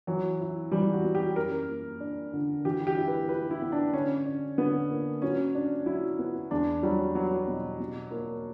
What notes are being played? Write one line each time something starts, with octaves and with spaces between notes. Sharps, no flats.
E3 F#3
E4
E3 G3
F#4
B3
G4
F#2 A#4
A#3
D4
D3
E3 G4
G4
E4
B4
G4 B4
E4
B3
D4
D3 C#4
D4
D3 B3
A#3
F#3 C#4
D4
F#3 E4
B3
E2 D4
F#3 G3
F#3 B3
B2
B2
A#3